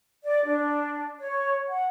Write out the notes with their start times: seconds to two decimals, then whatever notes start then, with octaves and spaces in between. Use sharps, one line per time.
0.24 D5
0.45 D4
1.19 C#5
1.68 F#5